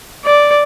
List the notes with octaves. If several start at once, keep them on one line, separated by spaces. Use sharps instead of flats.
D5